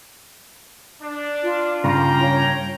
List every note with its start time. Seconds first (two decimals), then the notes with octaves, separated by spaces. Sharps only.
1.02 D4
1.43 F4
1.84 G2 C#3 A#3 G5 A#5
2.21 C#5